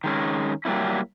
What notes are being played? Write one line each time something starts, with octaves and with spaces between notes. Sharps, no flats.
D#3 G#3 C#4
F#3 G3 A#3 C#4 E4